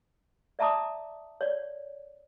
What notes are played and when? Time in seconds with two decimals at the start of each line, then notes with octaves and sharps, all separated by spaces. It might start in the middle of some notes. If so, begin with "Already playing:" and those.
0.59 D5 E5 A5 A#5 D6 D#6
1.41 C#5 D5